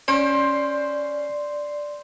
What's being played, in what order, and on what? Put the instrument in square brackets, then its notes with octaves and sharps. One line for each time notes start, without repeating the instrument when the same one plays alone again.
[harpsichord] C#4 [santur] C5 [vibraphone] D5